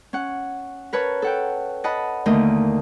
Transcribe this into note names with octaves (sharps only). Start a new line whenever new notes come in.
C#4 F#5
A#4 B4 C#5 A5
A4 F#5 G5
D#5 F#5 A5 B5
D#2 D3 A3 A#4 D#5